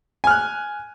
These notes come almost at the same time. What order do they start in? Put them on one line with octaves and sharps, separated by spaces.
G#5 F6 F#6